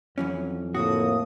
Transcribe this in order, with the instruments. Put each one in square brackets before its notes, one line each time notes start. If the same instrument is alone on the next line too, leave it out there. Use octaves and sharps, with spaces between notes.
[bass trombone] F2 [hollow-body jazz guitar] E3 F#3 C#4
[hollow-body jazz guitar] D2 F#4 [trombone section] A2 A#3 [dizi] D#6